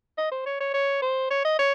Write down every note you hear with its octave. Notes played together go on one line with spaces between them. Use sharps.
D#5
C5
C#5
C#5
C#5
C5
C#5
D#5
C#5